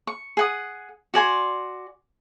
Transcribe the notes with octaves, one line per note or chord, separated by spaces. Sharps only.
C#6
G#4 F#5 D#6
F#4 D5 G#5 C6